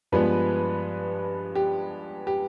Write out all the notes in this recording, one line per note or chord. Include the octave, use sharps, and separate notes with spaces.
G2 F3 G#3 B3 B4
G4
G4